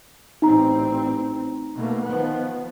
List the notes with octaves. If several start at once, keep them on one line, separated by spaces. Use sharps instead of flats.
A1 C4 D#4 A#5
B2 A3 A#3
D#3 F3 B3